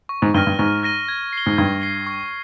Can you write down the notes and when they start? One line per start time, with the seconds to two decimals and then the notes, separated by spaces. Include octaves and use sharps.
0.09 C#6
0.22 G#2
0.34 G2 F6 A#6 D#7 G7
0.47 G2
0.59 G#2 C#6
0.83 F6 A#6 D#7 G7
1.08 G#6
1.33 C7 G7
1.46 G#2
1.58 G2 G#6
1.82 C7 G7
2.07 C#6